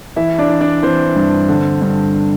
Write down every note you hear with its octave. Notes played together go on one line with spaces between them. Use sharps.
E3 E4 E5
D4 D5
E3
D4 D5
E3 C4 C5
G2
D3
G2